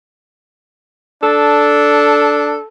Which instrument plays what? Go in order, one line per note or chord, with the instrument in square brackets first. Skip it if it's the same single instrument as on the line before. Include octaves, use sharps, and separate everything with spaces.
[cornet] D4 [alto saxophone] A4